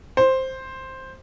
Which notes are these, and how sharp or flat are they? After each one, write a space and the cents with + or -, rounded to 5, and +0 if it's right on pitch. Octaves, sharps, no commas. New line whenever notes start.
C5 +5